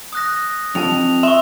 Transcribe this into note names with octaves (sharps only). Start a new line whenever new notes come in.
D#6 F#6 A#6
F2 A5 F7
E5 C6 C#6